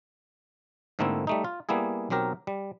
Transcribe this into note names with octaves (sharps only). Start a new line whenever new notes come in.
G#2 D3 A3 A#3 C4 E4
G3 A3 D#4
F4
G3 A#3 B3 E4 G#4
B1 F#3 C4 G4 A#4
G3